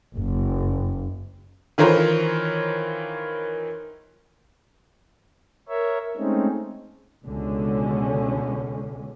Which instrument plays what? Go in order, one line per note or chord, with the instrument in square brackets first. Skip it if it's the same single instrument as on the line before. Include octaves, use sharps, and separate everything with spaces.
[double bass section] F#1
[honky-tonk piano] D#3 E3 F4 A#4 C5 C#5
[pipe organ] A#4 C#5 E5
G#3 A3 C4 C#4 D#4
[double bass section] C#2 B2 D3 G#3 C#4